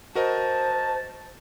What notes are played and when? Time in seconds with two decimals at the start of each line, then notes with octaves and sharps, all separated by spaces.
0.15 F#4 A#4 C5 D#5 A5